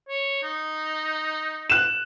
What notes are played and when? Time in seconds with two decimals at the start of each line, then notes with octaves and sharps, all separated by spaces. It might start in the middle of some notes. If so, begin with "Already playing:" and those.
0.09 C#5
0.43 D#4
1.70 F#6 E7